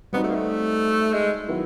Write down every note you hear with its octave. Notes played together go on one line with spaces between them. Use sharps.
G3 B3 C4 D#4 F#4
A3
A#3
A3
G#3
D#3 F#3 B3 E4